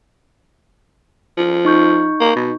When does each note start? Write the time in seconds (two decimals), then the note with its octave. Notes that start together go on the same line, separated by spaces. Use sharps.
1.37 F3
1.65 D#4 C#6 G6
2.20 A#3
2.35 B2